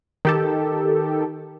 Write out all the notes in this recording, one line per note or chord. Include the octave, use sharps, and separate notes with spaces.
D#3 G4 A4